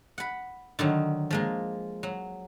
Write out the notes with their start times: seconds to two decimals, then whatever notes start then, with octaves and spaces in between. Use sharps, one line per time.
0.18 F#5 B5
0.79 D3 D#3 F#3
1.31 F3 G#3 A#3
2.03 F#3